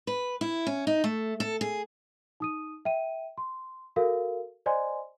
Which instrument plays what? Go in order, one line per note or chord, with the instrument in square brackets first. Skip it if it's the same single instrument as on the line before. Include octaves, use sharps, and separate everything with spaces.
[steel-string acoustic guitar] B4
E4
C#4
D#4
A3
A4
G#4
[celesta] D#4 D#6 D#7
E5 G5 D#7
C6
F#4 A4 A#4 F5
C5 D5 D#5 G#5 C6